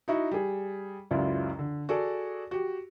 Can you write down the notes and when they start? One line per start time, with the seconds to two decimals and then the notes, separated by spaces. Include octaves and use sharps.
0.08 D#4 E4 F#4
0.31 G3 G#4
1.11 C#2 F#2 C#3 E4 F4 D5
1.59 D3
1.89 F#4 G#4 A4 D5
2.51 F#4 G4